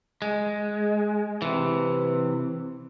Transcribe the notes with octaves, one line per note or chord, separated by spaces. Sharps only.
G#3
C3 E3